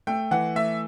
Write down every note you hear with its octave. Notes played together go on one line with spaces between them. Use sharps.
A3 G5
E3 F#5
A3 E5